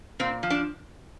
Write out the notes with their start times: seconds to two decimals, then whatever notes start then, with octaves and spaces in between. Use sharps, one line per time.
0.19 A#2 C4
0.43 F3
0.50 D4